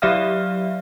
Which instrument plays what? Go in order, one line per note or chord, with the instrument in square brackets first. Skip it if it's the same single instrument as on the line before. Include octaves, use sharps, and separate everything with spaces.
[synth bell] F#3 G4 D5 E5 F5 F6